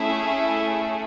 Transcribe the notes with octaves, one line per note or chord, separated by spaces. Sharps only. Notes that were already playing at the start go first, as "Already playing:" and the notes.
Already playing: A3 C#4 E4 G#4 E5